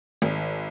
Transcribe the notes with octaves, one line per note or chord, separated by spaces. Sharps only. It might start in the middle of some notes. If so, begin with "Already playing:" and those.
G#1